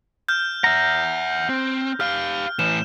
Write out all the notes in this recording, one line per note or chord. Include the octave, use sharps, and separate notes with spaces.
F6 G6
E5 F#5 A#5
C4
G4 F5 F6
A2 E3 E7